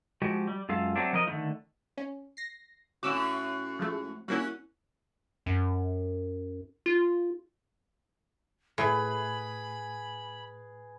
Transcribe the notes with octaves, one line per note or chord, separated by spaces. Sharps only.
F3 G#3 F#4 G4
G3
F#2 G#3 F4 A4 F5
F#3 A3 C4 D4
F3 A#4 D#5
D3 D#3 A3 D#4
C#4
A#6 C7
A2 C#4 F#4 D6 E6
F3 G#3 A3
G3 A#3 C#4 E4 F#4
F#2
F4
A2 G#4 B4 B5